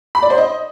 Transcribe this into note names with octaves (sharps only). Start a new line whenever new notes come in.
B5
D5
C5
D#5